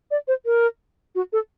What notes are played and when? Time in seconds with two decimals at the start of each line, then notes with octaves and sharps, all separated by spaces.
0.11 D5
0.28 C5
0.46 A#4
1.15 F#4
1.33 A4